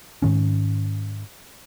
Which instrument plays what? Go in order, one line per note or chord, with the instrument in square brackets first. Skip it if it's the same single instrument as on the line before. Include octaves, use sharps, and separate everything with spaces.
[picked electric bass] G#2 D#3 C#4